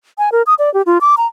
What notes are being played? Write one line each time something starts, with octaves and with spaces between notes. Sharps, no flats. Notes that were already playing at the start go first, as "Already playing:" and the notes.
G#5
A#4
D#6
D5
G4
F4
D6
A#5